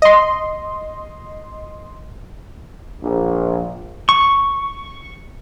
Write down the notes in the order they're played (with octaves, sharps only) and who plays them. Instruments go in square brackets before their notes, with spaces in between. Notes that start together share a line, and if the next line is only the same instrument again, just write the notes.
[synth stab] D#5 C6
[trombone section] A#1
[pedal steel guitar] C#6